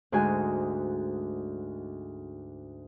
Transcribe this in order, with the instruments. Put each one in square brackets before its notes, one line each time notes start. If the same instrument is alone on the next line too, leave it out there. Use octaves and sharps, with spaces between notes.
[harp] D2 G#2 F#4 G#5